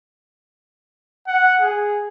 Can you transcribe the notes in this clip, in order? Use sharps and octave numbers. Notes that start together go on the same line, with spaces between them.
F#5
G#4